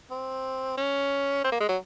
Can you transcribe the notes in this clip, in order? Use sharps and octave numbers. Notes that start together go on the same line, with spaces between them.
C4
C#4
C4
A#3
G#3
F#3